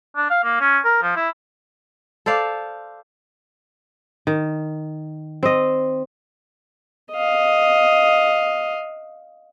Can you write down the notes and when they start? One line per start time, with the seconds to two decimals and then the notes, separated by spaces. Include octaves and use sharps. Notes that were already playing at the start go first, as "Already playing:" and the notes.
0.17 D4
0.30 F5
0.44 A#3
0.61 C#4
0.85 A#4
1.02 F3
1.16 E4
2.26 A4 C5 D5 F5
4.27 D#3
5.43 C4 D#5
7.13 D#5 F5